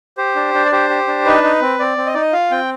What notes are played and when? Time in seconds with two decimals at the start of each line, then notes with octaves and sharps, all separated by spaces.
0.18 G4 C5
0.36 D4
0.54 D4
0.65 D5
0.72 G4 C5
0.90 G4
1.08 D4
1.25 D#4 B4
1.43 D#4
1.62 C4
1.80 C4 D5
1.97 C4
2.06 D#5
2.14 D#4 D5
2.22 D#5
2.33 F4 F5
2.51 C4 G5